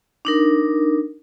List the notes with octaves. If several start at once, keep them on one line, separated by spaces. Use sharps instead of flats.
D4 D#4 A#4